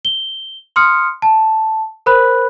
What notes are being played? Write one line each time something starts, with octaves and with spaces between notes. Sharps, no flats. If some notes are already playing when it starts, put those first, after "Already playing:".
G7
C6 D#6 F6 C#7
A5
A#4 C5 B5 F#6